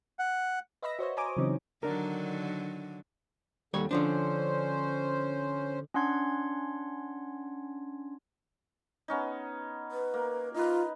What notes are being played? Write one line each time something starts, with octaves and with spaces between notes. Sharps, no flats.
F#5
B4 D#5 E5 B5 E6 A#6
F#4 C5 C#5 D#5
C5 C#5 G#5 A#5 D6 D#6
C#3 E3 F#3 C4 C#4 D#4
D3 D#3 F#3 D4 A#4
D#2 D3 G3 C#5
D3 F3 C#4 D4 C5
C#4 D4 F#5 C6 G#6
B3 C#4 D#4
B4
A#3
D#4 F4 B4